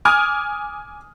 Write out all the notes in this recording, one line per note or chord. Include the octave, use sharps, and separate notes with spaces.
G#5 D6 D#6 F6 G#6